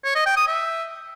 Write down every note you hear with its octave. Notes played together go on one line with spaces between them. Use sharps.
C#5
D#5
G5
D#6
E5